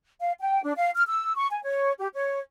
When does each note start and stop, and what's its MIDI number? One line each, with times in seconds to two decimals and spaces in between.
0.20 0.32 77
0.40 0.61 79
0.63 0.73 62
0.77 0.91 77
0.95 1.03 89
1.07 1.36 88
1.37 1.47 85
1.51 1.60 80
1.64 1.93 73
1.98 2.07 67
2.13 2.40 73